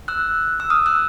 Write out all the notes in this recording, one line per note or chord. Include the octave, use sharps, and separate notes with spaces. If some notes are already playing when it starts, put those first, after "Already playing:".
E6 F#6
E6
D#6 F6
E6 F#6